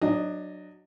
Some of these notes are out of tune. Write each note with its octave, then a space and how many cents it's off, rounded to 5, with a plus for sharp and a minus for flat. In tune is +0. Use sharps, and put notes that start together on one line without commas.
F#3 +0 D4 +20 D#5 +0